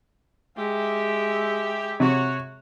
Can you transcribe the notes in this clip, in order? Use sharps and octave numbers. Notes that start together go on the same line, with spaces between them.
G#3 G4 E5
C3 F#4 C#5